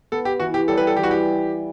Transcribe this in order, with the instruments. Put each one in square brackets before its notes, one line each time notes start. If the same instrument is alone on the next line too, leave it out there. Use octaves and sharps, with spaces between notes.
[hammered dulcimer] B3 [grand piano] A4
[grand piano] G4
[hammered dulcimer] E3 [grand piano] F#4
[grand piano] G4
[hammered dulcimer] G3 [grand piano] A4
[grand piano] B4
A4
[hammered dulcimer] E3 [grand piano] G4
[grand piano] F#4
G4